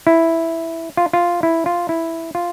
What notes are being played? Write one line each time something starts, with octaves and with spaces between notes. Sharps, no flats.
E4
F4
F4
E4
F4
E4
F4